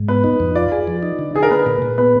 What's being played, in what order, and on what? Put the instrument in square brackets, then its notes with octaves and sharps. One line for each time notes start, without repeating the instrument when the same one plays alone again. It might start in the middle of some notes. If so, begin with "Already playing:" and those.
Already playing: [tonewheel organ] G#2
[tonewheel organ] B3 [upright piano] B4
[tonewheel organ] D#4
F2
[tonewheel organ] F4 [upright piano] D5
[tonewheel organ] G#4
F3
D#4
D3
[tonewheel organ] D3 [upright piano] G#4
[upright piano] A#4
[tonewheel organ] A#3 [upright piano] B4
[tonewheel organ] A#2
A#2
[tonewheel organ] B3 [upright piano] B4